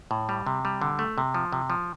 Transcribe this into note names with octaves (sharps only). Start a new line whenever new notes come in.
A2
G3
C3
G3
D3
A3
C3
F3
C3
F3